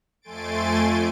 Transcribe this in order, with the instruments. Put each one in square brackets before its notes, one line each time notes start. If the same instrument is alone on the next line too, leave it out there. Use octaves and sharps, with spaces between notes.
[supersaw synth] F2 A3 G#5 C6 A6 D7